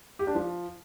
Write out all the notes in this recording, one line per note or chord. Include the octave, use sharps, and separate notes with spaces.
G4
D4
F3